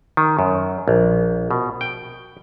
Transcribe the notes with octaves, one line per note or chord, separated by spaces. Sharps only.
D#3
F#2
A#1
B2
G5